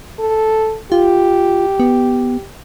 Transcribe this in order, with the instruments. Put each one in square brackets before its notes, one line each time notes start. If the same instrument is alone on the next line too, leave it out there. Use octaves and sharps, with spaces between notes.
[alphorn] A4
[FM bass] F4 [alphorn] G4
[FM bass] B3